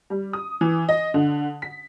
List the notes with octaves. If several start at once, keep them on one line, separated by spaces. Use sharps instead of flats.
G3
D#6
E3
D#5
D3
B6